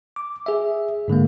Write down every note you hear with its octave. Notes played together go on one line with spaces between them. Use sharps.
D6
G#4 E5
G#2 D3 G#3 A#3